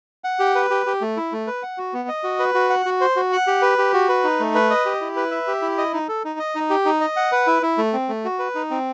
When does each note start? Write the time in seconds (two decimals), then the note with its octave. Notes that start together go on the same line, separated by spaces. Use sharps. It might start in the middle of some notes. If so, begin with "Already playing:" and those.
0.24 F#5
0.39 G4
0.55 B4
0.70 G4
0.86 G4
1.01 A3
1.17 E4
1.32 A3
1.47 B4
1.63 F#5
1.78 F#4
1.93 B3
2.08 D#5
2.24 F#4
2.39 B4
2.55 F#4
2.70 F#5
2.86 F#4
3.01 C5
3.16 F#4
3.32 F#5
3.47 G4
3.62 B4
3.78 G4
3.93 F#4
4.09 B4
4.24 D#4
4.40 A3
4.55 B4
4.70 D#5
4.86 G4
5.01 E4
5.16 B4
5.31 E5
5.47 G4
5.62 E4
5.78 D#5
5.93 D#4
6.08 A4
6.25 D#4
6.39 D#5
6.55 D#4
6.70 G4
6.85 D#4
7.01 D#5
7.16 F#5
7.32 B4
7.47 E4
7.62 E4
7.78 A3
7.93 C4
8.09 A3
8.24 F#4
8.39 B4
8.55 D#4
8.71 C4